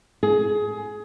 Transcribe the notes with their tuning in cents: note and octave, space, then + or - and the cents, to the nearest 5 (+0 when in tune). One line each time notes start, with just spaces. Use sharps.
G#4 +20